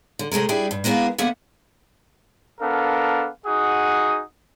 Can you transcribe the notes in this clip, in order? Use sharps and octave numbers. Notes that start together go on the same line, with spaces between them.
D3
C3 G#3 A3 G#4 A#4
G3 D4 E4 G4 G#4
G2
G#3 A#3 B3 E4 F5
D3 A#3 B3 E5 F#5
B3 D4 A4 A#4 F5
D#4 F#4 G#4 F#5 D#6